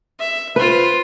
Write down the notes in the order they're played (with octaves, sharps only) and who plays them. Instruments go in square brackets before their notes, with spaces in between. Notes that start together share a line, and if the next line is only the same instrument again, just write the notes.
[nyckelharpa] E5
[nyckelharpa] F4 C5 [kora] B4